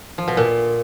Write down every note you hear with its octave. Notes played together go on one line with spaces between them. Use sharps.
F3
B2
A#2